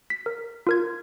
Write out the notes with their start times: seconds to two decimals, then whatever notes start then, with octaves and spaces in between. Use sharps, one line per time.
0.10 B6
0.26 A#4
0.67 F4 A#4 G#6